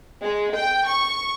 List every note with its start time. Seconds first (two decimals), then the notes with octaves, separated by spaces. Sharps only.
0.23 G#3
0.56 G5
0.87 C#6